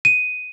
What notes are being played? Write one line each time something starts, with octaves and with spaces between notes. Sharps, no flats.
D#7